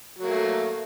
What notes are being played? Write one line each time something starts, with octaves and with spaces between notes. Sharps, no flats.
F#3 A3 A#3